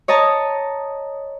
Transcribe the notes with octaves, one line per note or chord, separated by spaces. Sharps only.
C#5 D#5 A5 A#5